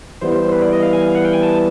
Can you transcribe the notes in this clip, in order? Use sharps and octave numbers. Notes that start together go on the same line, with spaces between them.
E3 G3 B3 C5
C5
C5
B4
D5
D#5
F5
G#5
F5
F#5
G5
G#5
A5